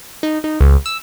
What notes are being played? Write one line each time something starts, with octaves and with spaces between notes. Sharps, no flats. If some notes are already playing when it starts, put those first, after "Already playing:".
D#4
D#4
C#2
E6